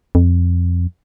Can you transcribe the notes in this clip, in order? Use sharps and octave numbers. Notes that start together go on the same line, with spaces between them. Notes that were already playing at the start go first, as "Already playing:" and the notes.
F2